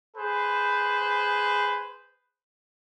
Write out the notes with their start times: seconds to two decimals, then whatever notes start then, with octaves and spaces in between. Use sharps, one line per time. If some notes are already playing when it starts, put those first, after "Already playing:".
0.17 G#4 B4 C5